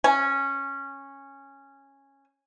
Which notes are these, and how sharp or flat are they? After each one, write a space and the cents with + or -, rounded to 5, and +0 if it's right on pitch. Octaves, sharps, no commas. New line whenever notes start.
C#4 -10 G#5 +0